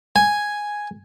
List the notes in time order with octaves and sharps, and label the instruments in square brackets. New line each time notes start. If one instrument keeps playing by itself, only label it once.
[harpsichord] G#5